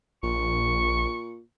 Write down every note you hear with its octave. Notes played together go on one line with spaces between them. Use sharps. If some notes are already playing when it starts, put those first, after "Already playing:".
A#1 A#2 C#6